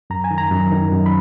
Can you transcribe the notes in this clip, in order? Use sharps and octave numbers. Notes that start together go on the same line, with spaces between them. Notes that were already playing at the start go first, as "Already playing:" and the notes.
F#2 A#5
G#5
D#3
A#5
F#2
D#3
F#2
B5